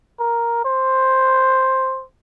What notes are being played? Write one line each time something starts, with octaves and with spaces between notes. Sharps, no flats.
A#4
C5